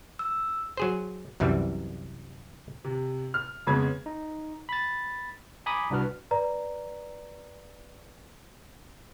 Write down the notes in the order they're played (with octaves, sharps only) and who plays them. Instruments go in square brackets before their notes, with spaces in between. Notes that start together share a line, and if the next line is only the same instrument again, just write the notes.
[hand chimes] E6
[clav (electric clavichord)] F#3 G#4 C5
C2 F#2 E3 G3
[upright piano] C3
F6
F2 C#3 G#3 B3 G#6
[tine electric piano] D#4
B5 A6
G#5 A#5 B5 D6 D#6
C2 D4 F#4 B4 F6
[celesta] B4 D5 A#5